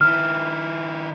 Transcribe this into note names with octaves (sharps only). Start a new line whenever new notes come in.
D#3 E4 F6